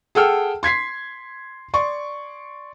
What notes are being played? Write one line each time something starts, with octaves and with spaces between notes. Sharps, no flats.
G#4 A4 F#5 G5 E6 F6
C6 G#6 B6 C7
D5 C6 C#6